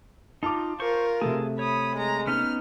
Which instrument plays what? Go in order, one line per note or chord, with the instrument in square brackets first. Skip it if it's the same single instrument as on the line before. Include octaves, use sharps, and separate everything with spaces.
[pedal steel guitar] D#4 F4 [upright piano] A5 D6
[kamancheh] F4 A#4 [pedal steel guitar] C5 C#6
[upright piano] C3 A3 [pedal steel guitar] G#4 A4
[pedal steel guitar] C#5 [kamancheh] B5 D#6
[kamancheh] G#3 A#5
[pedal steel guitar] B3 C#4 D#4 [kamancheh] F6